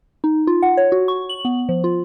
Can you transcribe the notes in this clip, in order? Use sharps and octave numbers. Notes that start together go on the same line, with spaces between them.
D#4
F4
F#5
C#5
F#4
C#6
F#7
B3
F3
F4